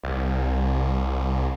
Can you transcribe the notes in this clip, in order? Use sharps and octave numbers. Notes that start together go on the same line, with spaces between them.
C2